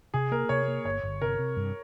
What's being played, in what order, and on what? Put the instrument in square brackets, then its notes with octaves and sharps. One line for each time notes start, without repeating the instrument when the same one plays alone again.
[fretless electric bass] C3 [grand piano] G#4
[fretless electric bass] A#3 [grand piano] A#4
[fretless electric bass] C3 [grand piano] C#5
[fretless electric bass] A#3
[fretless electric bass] G1 [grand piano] C#5
[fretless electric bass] G1
[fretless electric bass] C3 [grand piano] A#4
[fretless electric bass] C3
G2